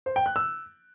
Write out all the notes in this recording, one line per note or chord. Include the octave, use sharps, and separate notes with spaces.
C5
G5
F#6
E6